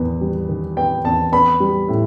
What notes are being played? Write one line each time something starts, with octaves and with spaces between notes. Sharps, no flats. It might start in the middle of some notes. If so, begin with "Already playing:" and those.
Already playing: E2 D#3 B3
G3
D#3
B3 G5
E2 A5
B3 B5
G3
A2